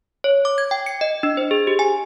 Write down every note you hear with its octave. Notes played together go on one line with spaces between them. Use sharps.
C#5
D6
G#6
G5
C#7
D#5
D4
C5
G#4
G4
G#5